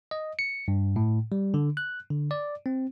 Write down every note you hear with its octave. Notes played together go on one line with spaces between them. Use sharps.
D#5
C#7
G2
A2
G3
D3
F#6
D3
D5
C4